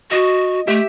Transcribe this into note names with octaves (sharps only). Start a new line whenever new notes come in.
F#4 D#5
A3 G4 E5